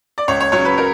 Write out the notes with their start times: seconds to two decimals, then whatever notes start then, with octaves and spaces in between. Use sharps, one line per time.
0.18 D5
0.28 C#2 C#5
0.40 C#5
0.52 C#3 F#3 C#5
0.65 B4
0.78 A#4